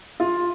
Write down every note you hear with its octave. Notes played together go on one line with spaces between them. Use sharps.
F4